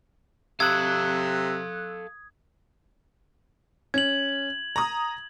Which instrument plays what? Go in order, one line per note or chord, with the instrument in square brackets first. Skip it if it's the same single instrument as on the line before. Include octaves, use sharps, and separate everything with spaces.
[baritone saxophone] C3 [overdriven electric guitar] A4 F5 [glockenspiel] D#6 G#6 [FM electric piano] E6 F#6
[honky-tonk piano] C#4 [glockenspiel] G#6 F#7
[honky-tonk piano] A#5 D#6